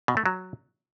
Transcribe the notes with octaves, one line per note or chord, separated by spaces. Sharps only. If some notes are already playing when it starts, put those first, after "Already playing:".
B2
A3
F#3